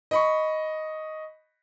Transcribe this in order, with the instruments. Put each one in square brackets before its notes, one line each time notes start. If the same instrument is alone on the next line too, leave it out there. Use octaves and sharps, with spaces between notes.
[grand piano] D#5 B5 C#6